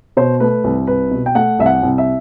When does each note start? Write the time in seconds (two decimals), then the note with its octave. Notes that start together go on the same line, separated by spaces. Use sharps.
0.17 B2 C5
0.40 A3 B4
0.64 C2
0.87 C2 B4
1.11 B2
1.26 G5
1.35 A3 F#5
1.59 C2 E5
1.66 F#5
1.83 C2
1.98 E5